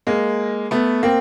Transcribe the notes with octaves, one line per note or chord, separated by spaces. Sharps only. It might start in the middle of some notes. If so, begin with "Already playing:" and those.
G#3 A#3
A3 B3
A#3 C4